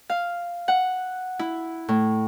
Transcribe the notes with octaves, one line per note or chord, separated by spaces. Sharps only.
F5
F#5
E4
A2